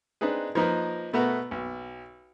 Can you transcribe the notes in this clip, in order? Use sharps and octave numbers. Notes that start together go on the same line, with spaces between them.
C4 D4 D#4 G#4 B4
F3 A#3 D#4 A#4 B4
B2 A3 B3 F#4 A#4 B4
B1